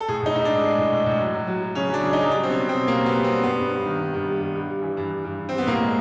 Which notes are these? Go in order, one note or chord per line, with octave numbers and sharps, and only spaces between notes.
A4
A2 G#4
A2 D#4
A2 D#4
G#3 D4
G#3
A2
A2
A2
F#3
F#3
F#3
F#3
C#3 C#4
F#3 D4
C#3
D#4
F#3
G3 D4
C4
B2 C#4
B2
C4
B2
G3 A#3
G3 B3
G3
C4
G3
G2 B3
G2
G2
D#3
D#3
G2
G3
G2
G2
G3
E3
G2
G2
G2
G2
C4
G3
B3
A2 A#3
G#3